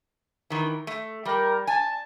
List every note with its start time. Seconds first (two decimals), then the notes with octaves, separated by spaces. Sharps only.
0.50 D#3 E3
0.87 A3
1.25 G3 A#4 G5
1.67 G#5 A5